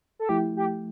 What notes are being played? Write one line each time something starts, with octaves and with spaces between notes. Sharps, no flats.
A4
F3 A3 E4 G4
G4